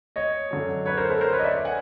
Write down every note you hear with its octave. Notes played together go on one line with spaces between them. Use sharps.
C#5 D#5
F#2 D3
B4 C#5
A#4 C5
A4 B4
A#4 C5
B4 C#5
D#5
D5 E5
F#5 G#5